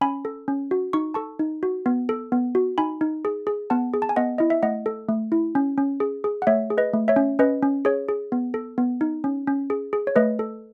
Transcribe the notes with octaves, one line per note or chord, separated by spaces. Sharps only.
C#4 G#5 B5
A4
C#4
F#4
D#4 C#6
A4 A5 C#6
D#4
F#4
B3
A4
B3
F#4
D#4 G#5 B5
D#4
G#4
G#4
B3 F#5 A5
G#4
A5
G#5
B3 D#5 F#5
E4 D#5
E5
A3 D#5 F#5
A4
A3
E4
C#4
C#4
G#4
G#4
F#5
A3 C#5 E5
G#4
B4 D#5
A3
C#5 E5
C#4
C#4 B4 D#5
C#4
G#4 C#5
G#4
B3
A4
B3
D#4
C#4
C#4
G#4
G#4
C#5
A3 B4 D#5
A4